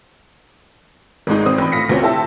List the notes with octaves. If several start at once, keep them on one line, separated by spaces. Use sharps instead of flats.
G#1 G#2 G#3 D#4
G#1 C4 D#6
A1 B5
A2 F5 A#6 B6 C#7
D2 F3 F#3 C4 C#4
E4 G4 C5 A5 E6